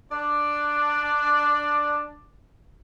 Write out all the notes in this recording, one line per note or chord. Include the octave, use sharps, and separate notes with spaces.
D4 D5